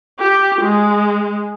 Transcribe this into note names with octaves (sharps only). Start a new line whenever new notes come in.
G4
G#3